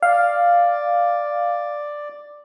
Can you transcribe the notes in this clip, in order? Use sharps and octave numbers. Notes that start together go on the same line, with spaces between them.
D5 F5